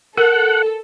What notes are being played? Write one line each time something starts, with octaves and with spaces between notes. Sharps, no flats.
A4 A#4 F#5